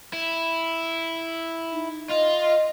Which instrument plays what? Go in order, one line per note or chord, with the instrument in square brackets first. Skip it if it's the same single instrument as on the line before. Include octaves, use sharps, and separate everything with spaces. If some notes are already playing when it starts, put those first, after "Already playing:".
[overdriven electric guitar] E4
[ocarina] D#4
[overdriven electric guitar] F4 [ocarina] D#5